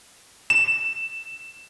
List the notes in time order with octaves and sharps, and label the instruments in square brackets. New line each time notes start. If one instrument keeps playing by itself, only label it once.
[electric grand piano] E7